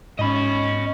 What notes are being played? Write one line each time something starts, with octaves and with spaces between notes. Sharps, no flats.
G#2 C#4 D#5 B5